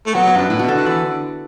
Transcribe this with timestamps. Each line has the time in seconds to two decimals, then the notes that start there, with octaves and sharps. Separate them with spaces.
0.06 A3
0.14 F#3 B3
0.27 B3
0.36 F#2 D4
0.49 A2 E4
0.59 B2 F#4
0.68 A4
0.74 D3 B4
0.86 E3 D5
1.04 D3